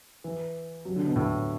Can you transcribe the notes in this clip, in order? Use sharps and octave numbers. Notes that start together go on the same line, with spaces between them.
E3
F#3
D3
B2
A2